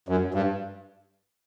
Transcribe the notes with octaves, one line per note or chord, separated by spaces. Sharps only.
F#2
G2